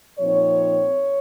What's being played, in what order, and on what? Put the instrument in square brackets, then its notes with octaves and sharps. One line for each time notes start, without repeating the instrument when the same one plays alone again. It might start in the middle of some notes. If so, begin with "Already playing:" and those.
[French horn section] A#2 F3 C4 D#4 C#5